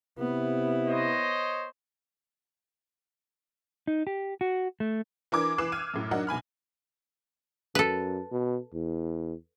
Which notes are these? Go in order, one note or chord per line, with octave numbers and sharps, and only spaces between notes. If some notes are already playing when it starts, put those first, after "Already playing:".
C3 B3 E4
C5 C#5 D#5
D#4
G4
F#4
A3
E3 D4 A#4 D6 G#6
E3 B4 D6 F#6 C7 E7
E6 F6 G#6 D#7
F#2 A2
F#3 D4 D#4 A#4 F#5
B1 G#5 B5 F6
F#2 A4 B4
B2
E2